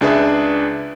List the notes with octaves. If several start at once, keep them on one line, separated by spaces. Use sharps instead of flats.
C#2 D4 G#4 B4 E5